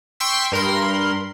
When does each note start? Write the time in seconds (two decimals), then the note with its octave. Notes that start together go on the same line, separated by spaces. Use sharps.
0.20 G5 C6 C#6 E6 B6
0.52 G2 A#4 B5 C6